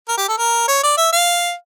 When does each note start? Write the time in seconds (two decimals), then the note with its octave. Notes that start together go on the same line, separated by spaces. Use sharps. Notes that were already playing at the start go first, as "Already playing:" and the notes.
0.08 A#4
0.18 G4
0.28 A4
0.38 A#4
0.68 C#5
0.83 D5
0.97 E5
1.13 F5